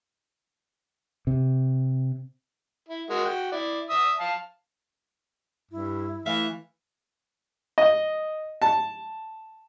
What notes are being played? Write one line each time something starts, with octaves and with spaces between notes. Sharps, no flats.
C3
E4
G#3 F#4 A#4
F#4 G5
E4 D5
E5 D#6 E6
F5 A5
G2 E4
E3 A3 F4 E5 F5
D#5
A5